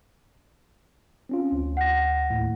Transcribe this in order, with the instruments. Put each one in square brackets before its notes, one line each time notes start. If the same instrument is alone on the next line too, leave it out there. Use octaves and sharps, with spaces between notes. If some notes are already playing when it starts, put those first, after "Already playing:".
[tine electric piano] C4 C#4 F4
D2
[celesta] F#5 A#6
[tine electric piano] D#2 A2